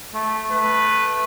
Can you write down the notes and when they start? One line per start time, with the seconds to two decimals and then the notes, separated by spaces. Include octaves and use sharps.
0.14 A3
0.51 A3 B4